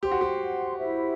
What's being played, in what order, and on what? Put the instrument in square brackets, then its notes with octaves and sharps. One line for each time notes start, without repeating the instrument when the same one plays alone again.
[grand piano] G4 [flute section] C5 F#5 C6
[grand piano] F#4
G4
[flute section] E4 G4 C5 E5